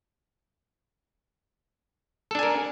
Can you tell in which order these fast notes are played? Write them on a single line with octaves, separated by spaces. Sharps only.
A4 D4 G#5 A#4